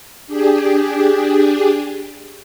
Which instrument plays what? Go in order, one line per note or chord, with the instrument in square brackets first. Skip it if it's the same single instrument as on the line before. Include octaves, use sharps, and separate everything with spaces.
[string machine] D4 G4 G#4